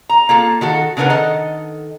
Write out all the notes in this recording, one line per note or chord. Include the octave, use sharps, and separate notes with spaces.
A#5
A#3 F4 A4
D#3 F#4 A4
C#3 D4 D#4 A#4 B4 F#5
D#3 A4 D#5